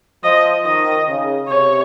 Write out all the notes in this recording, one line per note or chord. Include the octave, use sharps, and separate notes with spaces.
F3 D#5
D#3 D#5
C#3
C3 C#5